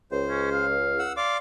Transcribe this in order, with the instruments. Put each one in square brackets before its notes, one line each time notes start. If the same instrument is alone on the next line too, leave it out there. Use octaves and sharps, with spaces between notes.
[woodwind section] C#2 [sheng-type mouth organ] C5
[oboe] C#4
F5
[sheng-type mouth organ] F#5 E6
[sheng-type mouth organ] D5 F5 D6 [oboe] C6